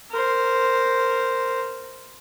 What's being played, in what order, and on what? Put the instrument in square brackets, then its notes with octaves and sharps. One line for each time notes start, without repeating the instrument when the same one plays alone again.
[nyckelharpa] A#4 C5